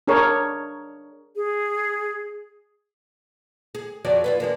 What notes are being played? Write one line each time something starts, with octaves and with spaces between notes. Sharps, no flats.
D4 G#4 A#4 C#5
G#4
G#4
F2 F#3 D5
D#2 F4 B4
G#3 A#3 D4